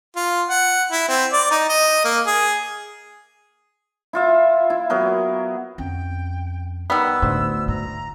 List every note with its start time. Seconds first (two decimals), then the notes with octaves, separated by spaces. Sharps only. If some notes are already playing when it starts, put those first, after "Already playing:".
0.16 F4
0.49 F#5
0.91 E4
1.08 C4
1.33 D5
1.51 D#4
1.69 D#5
2.04 A#3
2.26 G#4
4.13 E4 F4 E5
4.70 E4
4.90 F#3 B3 A#4
5.78 F2 C#4 G5
6.90 D#3 G3 B3 E6
7.22 D2 A2 C5
7.68 G#2 A#5